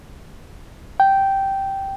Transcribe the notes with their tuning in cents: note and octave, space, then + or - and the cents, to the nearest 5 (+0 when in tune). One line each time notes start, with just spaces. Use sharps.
G5 -10